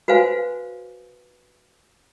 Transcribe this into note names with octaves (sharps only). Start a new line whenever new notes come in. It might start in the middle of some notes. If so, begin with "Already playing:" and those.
F#4 B4 C5 F5 G#5